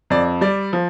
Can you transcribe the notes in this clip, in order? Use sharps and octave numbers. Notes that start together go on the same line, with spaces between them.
F2 D5
G3 D5
F3